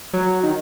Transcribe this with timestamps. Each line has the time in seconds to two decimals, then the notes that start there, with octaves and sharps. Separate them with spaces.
0.13 F#3
0.43 D#3